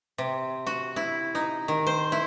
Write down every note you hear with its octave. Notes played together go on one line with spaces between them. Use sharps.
C3
F#4
E4
D#4
D#3
C5
E4